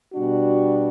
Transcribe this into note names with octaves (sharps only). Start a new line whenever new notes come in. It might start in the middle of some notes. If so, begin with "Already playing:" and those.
B2 G3 D4 F#4